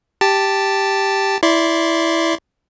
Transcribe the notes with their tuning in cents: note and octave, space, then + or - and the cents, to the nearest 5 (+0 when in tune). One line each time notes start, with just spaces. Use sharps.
G4 +0 A5 +0
E4 +0 D5 -15 C6 +0